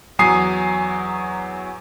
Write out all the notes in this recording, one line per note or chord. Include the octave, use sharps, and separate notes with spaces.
E2 F#3 G#5 A#5 D#6 C7